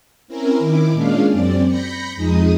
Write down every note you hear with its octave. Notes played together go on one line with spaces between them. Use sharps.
C4 C#4 E4 A#4
D#3 E4 D6
A#2 G#3 C#4 D4 F5
F#2 C4 D5
B5 G6 A#6 C#7
F2 G#3 D#4 D#6